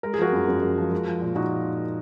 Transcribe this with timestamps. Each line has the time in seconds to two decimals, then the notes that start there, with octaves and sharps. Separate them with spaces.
0.03 G#3 A#4
0.14 G#4
0.18 F3 F#4 A#4
0.33 F#2
0.48 F#2
0.62 G#3
0.78 F3
0.91 G#3
1.07 F3
1.21 A#2
1.35 A#2 D#4 F#4